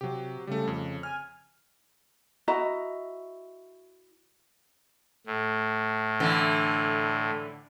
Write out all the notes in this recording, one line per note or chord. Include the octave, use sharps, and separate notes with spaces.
C3 F#3 G4
C#3 G3 A3
F2
G#5 F6
E4 F#4 D#5 A#5
A2
D3 E3